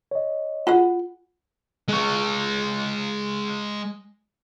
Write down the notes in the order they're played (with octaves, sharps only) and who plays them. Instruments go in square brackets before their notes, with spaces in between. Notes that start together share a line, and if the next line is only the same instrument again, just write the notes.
[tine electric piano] C#5 D#5
[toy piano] F4 [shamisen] F#4 G#4 F#5
[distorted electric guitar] G#3 C#5